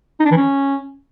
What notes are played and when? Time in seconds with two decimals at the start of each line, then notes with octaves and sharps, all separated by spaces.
0.20 D#4
0.26 D4
0.31 E3
0.37 C#4